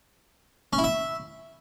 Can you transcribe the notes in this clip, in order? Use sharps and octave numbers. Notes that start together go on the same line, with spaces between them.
C#4
E4
E5